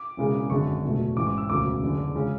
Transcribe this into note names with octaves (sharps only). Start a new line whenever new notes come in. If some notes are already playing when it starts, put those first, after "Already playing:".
Already playing: D6
E1 E2 C#3 G#3
G#1 F#2 D3 G#3 C#6
F#1 E2 B2 F#3 A3
A1 G#2 E3 D6
D6
E6
E1 D2 C#3 F#3 D6
F#1 E2 D3
C#3 G#3 C#4